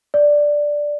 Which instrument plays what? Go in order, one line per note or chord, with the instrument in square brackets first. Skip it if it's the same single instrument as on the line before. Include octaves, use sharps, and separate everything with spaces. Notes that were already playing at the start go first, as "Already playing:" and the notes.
[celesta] D5